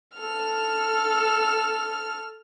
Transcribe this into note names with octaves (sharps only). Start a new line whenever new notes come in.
A4 F6